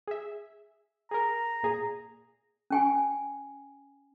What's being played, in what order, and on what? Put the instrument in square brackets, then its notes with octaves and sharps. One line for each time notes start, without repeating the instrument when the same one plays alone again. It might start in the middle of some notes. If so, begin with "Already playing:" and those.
[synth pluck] G#4 E5
[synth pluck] G#4 A#4 [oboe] A#5
[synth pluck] A#2 G#4
[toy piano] C#4 G5 G#5